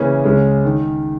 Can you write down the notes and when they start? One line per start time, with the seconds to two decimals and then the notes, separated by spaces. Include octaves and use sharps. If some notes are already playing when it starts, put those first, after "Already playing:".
Already playing: C#3 E3 A#3 C#4
0.25 C#2 C#3 G#3 C#4
0.65 D#3